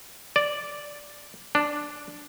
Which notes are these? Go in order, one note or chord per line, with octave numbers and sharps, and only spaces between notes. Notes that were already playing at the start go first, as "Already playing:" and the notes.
D5
D4